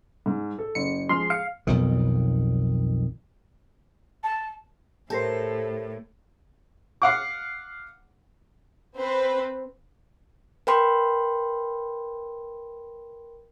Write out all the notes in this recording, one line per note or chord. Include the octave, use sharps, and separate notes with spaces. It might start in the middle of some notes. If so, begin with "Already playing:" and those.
G#2
A4
F#1 C#7
F3 G#3 C6 F6
F5 C#7
B1 F2 D#3
A5
A2 G4 A4 A#4 C5
F5 F#5 D6
C4 B4 C5
A#4 B4 G5 B5 C6